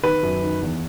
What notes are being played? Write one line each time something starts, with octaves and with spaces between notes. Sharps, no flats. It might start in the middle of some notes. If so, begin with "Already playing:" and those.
D#3 B4
F#2
D#3
E2